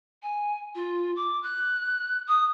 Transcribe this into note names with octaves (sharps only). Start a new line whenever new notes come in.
G#5
F4
D6
F#6
D#6